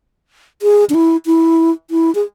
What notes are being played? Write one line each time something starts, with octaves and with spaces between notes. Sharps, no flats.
G#4
D4
E4
E4
E4
G#4